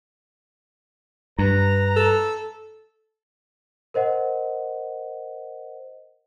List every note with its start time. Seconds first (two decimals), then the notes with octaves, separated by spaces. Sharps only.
1.39 G2 B4 A#5
1.96 A4
3.94 A#4 C5 D#5 F#5